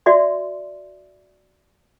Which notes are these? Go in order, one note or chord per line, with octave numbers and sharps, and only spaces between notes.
F#4 D5 E5 C6